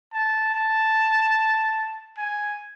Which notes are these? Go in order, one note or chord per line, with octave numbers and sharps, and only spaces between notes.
A5
A5
G#5